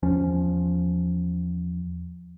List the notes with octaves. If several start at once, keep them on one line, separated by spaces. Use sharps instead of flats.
E2 F3 C#4